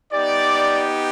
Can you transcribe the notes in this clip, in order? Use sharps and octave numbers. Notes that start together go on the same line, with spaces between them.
B3 D#4 G4 D5